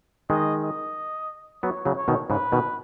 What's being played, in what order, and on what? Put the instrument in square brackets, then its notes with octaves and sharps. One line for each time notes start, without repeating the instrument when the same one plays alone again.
[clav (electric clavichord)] D#3 G#3 [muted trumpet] D#5
[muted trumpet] D#5
[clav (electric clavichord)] F#3 B3 [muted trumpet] C#5
[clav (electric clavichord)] C#3 F#3
[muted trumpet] C#5
[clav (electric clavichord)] B2 D#3
[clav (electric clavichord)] G#2 C#3 [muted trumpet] B4
[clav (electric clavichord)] B2 D#3